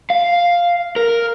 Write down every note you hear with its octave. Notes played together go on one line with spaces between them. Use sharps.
F5
A#4